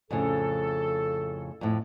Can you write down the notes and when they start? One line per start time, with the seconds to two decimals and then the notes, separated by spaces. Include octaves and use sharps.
0.11 F2 A2 C#3 A4
1.61 F2 A2